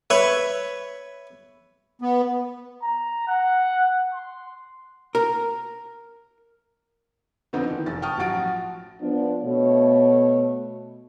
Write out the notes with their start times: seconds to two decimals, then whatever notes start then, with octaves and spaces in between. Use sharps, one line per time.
0.10 B4 C#5 E5
2.02 B3
2.82 A#5
3.27 F#5
4.14 C6
5.15 A#4
7.53 D3 F3 B3 C4 D4 D#4
7.68 D#3 E3
7.86 F1 A6
8.02 G5 A5 C#6 D#6 F6
8.18 A1 F3 F#3 F#4 A6 D7
9.01 F3 B3 D4
9.44 B2 A3 C#5